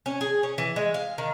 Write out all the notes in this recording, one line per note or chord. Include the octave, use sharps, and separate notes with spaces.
C#4
G#4
C#4
E3
G#3
F5
D#3